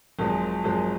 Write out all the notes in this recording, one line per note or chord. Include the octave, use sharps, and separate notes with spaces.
G#1 F#2 F3 G#3
G#1 F#2 F3 G#3